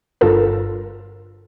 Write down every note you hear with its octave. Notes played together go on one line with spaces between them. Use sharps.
G1 G2 F4 A4 A#4